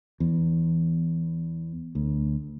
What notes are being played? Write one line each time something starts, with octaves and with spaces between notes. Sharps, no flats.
E2
D2